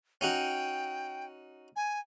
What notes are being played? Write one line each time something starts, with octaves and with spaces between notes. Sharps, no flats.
C#4 D#4 F#4 G5
G#5